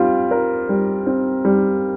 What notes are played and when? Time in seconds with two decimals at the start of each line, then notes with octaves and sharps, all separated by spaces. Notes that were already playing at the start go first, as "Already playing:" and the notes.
Already playing: G3 C4 F4
0.31 A#4
0.69 G3
1.07 C4
1.45 G3